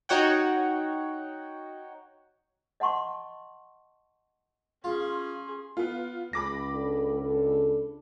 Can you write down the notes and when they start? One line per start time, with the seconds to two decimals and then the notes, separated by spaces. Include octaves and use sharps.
0.09 D#4 F#4 C#5 F#5 G5
2.80 D#5 F#5 A5 C6 C#6
4.84 C#4 F4 G#4 C6
5.77 B3 F4
6.33 C#2 B5 D6 A#6
6.74 D4 A4
7.18 D4 A4